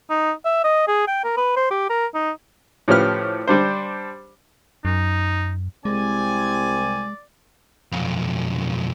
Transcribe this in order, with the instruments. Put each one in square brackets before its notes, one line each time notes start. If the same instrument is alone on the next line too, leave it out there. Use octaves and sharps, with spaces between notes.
[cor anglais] D#4
E5
D#5
G#4
G5
A#4
B4
C5
G4
A#4
D#4
[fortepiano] A2 F3 C#4 G4 B4 F6
G3 D4 C5
[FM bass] F#2 [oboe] D#4
[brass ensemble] C2 C4 G#5 [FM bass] G#3 [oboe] D5
[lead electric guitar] B1 F2